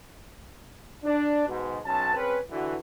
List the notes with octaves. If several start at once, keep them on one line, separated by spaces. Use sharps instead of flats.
D4
G#2 B2
B1 F#3 C#4 A5
C4 C#4 G#4 B4
D3 E3 F#4